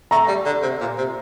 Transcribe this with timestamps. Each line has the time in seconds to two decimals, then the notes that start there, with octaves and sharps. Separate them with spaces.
0.11 A3 A#5
0.28 G3
0.46 D3
0.62 C3
0.81 A#2
0.98 C3